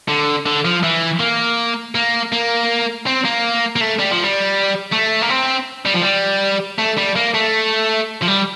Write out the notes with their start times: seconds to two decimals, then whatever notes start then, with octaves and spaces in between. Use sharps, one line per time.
0.09 D3
0.46 D3
0.65 F3
0.83 E3
1.20 A#3
1.95 A#3
2.32 A#3
3.06 C4
3.25 A#3
3.76 A#3
3.81 A3
3.99 G3
4.11 F3
4.23 G3
4.92 A3
5.22 A#3
5.30 C4
5.85 G3
5.94 F3
6.01 G3
6.79 A3
6.98 G3
7.16 A#3
7.35 A3
8.22 F3
8.28 G3